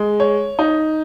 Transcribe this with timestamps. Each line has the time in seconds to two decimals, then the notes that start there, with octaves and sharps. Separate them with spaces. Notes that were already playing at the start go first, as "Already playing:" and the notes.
Already playing: G#3
0.20 C#5
0.59 D#4